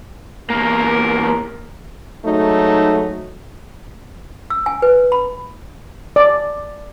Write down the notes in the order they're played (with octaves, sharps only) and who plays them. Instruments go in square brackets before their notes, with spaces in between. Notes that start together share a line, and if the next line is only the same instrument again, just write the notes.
[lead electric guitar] E2 A#3 [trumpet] A#4
[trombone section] G#2 F#3 A3 D#4
[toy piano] E6
G#5
B4
B5
[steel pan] D5